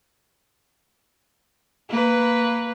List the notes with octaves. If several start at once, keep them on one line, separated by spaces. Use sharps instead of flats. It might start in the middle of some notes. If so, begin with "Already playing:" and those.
A#3 B4